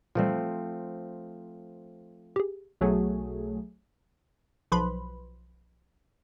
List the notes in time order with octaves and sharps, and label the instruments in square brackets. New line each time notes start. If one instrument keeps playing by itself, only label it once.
[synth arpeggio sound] A#2 E3 G3 [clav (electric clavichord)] F3 A3 C4
[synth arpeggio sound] G4 G#4
[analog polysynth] B1 F#3 A3 G#4
[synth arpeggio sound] B1 F3 B4 B5 C6